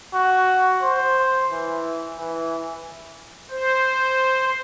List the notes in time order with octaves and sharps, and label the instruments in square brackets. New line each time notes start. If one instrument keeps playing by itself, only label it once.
[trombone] F#4
C5
E3
E3
[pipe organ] C5